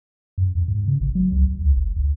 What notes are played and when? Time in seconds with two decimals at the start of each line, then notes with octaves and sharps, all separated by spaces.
0.38 F#2
0.55 E2
0.68 G#2
0.88 C#3
1.01 G#1
1.15 F#3
1.32 C#2
1.46 D#2
1.62 C#2
1.76 G1
1.97 D2